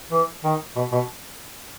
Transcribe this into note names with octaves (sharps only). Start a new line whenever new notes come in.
E3
D#3
B2
B2